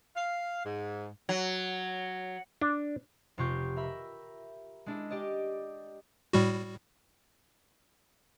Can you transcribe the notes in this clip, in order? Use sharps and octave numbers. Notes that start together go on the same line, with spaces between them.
F5
G#2
F#3
D4
F1 C3 F4 G4 C#6 G6
A#4 E5 B5
G#3 D4 E4
G4 D5 D#5
A2 G3 F#4